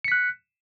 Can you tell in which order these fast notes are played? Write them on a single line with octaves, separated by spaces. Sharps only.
C#7 B6 F#6